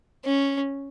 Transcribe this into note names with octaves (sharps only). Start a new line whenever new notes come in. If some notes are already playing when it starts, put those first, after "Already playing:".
C#4